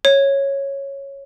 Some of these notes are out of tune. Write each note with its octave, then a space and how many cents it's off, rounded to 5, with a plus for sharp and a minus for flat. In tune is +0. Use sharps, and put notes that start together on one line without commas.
C#5 -5